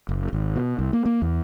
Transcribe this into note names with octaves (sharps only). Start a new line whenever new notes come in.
F#1
G#1
B2
C2
A#3
A#3
E2